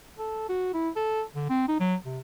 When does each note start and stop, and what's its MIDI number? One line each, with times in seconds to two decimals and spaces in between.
0.18 0.45 69
0.49 0.70 66
0.74 0.89 64
0.96 1.23 69
1.35 1.47 50
1.49 1.66 60
1.68 1.80 63
1.80 1.95 54
2.05 2.19 48